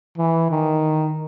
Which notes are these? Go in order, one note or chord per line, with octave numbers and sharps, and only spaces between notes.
E3
D#3